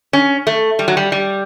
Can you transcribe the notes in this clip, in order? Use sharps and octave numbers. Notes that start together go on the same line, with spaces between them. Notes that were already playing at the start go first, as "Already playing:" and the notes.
C#4
A3
G3
F#3
G3
G3